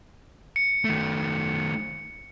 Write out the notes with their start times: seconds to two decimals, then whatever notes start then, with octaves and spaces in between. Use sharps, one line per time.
0.56 C#7
0.85 D#3 A3